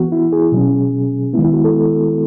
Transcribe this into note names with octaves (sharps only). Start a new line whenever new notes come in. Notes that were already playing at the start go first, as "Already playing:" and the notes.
Already playing: E3 B3 F#4
E4
G#4
B2 F#3 C#4
D#3 G#3 B3 E4
E4
F#4
A4